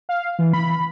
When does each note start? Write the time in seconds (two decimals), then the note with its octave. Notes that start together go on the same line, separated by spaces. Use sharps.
0.09 F5
0.39 E3
0.53 B5